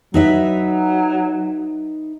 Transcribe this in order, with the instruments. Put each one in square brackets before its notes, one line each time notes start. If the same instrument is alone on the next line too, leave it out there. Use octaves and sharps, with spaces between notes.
[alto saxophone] F#3 [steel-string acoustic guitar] D#4 B4 E5